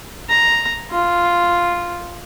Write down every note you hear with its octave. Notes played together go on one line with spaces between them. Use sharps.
A#5
F4